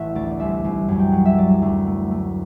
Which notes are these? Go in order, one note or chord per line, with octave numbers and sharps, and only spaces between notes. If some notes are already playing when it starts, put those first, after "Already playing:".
Already playing: A1 E5 F#5 A5
D2 D5
D5
C2 E5
C2
F#2
G5
F#3 F#5
E5
F#3 D5
D2
A3
A3